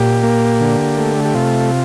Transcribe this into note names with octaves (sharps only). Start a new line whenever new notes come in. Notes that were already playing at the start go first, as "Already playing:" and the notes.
Already playing: A#2 G4
A#3
D3
A3
G4
C3 F4